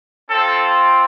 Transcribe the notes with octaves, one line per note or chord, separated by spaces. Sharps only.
C4 F4 A4